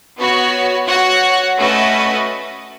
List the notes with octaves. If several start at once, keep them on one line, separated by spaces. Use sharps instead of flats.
B3 F#4 C#5
F#4 C#5 F#5
A3 C#4 F#4 B4 D#5